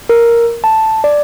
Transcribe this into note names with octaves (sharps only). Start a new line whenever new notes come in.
A#4
A5
D5